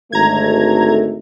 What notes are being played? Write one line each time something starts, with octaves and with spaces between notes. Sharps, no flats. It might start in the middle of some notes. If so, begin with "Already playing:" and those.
G#1 D3 A3 A#5 G#6